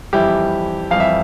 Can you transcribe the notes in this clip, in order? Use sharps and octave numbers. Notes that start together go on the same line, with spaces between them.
F2 E3 G3 E4 G4
F2 E3 G3 F5
E5